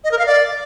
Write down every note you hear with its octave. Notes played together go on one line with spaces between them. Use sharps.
D#5
A#4
F5
D5